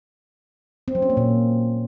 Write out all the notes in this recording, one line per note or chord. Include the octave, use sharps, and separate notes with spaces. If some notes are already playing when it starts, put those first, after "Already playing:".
C4
F#3
C#4
A#3
A#2